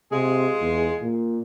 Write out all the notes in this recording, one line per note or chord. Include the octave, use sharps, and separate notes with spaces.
C3 G#3 F4 G#4
E2
A#2